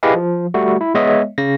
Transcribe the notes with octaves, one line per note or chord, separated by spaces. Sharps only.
E4 G4 G#4 B4 D#5 F5
F3
G3 A3 F#4
E4
G#3 B3 C#5 D#5 E5
C#3 A#6